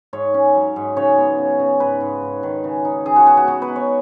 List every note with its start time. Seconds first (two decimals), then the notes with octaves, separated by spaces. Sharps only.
0.13 G#2 C#5
0.34 C#4
0.55 F#3
0.76 G#2
0.97 C#3 C#5
1.18 B3
1.38 C#3
1.59 C#3
1.80 G#2 B4
2.01 G#2
2.22 G#2
2.43 D#3
2.64 C#3
2.85 D#4
3.06 C#3 G#4
3.16 F#4
3.27 B3 F#4
3.37 F#4
3.48 B3 F#4
3.62 B4
3.68 D#4
3.76 C#5